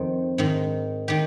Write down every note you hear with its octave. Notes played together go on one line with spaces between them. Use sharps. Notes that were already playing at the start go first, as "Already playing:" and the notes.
Already playing: F2 D#3
G#2 D#3
D#3 G4